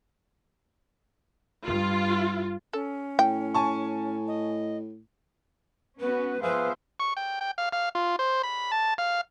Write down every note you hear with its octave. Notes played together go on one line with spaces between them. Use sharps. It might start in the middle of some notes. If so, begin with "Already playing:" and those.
G2 F4
C#4 A4
A2 G5
G#5 A5 C#6
D#5
B3 C#4 F#4 B4
F3 B3 G#4 B4 C5 E5 F5
C#6
G5
G5
F5
F5
F4
C5
B5
A5
F5